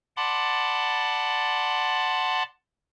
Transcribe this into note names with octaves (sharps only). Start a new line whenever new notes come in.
D5 F#5 A5 B5 C6 D6